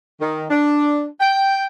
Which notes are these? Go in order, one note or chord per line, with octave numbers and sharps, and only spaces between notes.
D#3
D4
G5